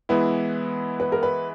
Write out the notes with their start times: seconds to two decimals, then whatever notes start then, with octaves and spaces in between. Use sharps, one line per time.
0.09 E3 G#3 B3 E4 B4
1.00 B4
1.12 A#4
1.23 B4